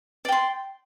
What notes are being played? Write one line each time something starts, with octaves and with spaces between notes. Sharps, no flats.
D5 G5 C6